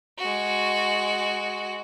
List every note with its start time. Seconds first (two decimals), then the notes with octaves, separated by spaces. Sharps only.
0.18 G#3 F#4